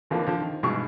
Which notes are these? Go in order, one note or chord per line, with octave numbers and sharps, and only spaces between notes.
D#2 D3 E3 F3 A#3 D4
D3 F3
D#3
G2 B2 E3 G#3 D#4 C#6